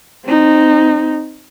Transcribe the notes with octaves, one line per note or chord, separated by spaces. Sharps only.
C4 D#4